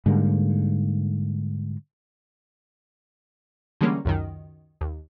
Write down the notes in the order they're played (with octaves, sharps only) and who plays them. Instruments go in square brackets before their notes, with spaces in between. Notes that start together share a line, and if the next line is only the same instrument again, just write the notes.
[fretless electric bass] G#2 D3 G3 A#3
[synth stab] D3 E3 G3 G#3 A#3 C#4
C#2 F#2 D#3
D#2